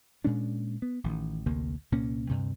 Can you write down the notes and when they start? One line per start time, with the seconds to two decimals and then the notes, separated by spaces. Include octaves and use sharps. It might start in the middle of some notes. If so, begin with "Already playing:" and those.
0.24 A#2 G#3 C#4 D4
0.82 B3
1.04 A1 D#3
1.46 A1 D2 C3 A#3
1.92 C2 A#2 A#3 C#4
2.29 D2 G2 C3